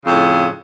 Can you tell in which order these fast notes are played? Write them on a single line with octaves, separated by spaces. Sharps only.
C#3 F2 A2